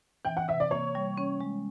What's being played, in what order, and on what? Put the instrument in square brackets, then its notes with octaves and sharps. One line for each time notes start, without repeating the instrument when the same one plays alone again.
[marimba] E3 [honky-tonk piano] G5
[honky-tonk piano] F#5
[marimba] C3 [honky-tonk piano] E5
[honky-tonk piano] D5
[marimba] A#3 [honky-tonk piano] C#5
[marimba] G3
C#4
G#3